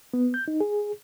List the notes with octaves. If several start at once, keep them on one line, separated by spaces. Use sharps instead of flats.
B3
G6
D#4
G#4